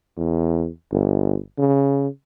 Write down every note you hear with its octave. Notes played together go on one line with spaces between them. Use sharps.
E2
G1
C#3